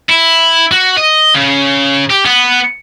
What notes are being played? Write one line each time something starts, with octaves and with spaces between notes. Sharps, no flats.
E4
F#4
D#5
C#3
G4
B3